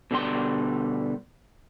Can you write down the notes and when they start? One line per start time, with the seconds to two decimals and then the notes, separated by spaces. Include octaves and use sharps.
0.11 B2 D3 G3 C6